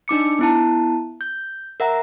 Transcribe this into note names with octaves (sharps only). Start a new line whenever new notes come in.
D4 D#4 D6 C#7
B3 E4 A5
G6
A#4 E5 F#5 A#5